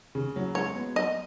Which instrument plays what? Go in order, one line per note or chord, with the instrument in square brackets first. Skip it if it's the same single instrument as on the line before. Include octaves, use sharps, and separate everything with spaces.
[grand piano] C#3
F#3
[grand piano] G#3 [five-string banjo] C#5
[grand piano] B3
[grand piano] F#3 [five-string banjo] D#5